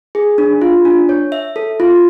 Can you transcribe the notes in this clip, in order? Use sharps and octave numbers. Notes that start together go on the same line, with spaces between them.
G#4
D4
F4
D4
C#5
E5
A4
F4